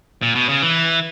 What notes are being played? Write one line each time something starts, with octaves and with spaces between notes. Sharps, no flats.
A#2
B2
C#3
E3